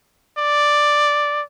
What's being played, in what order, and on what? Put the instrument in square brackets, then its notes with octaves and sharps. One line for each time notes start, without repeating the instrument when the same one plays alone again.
[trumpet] D5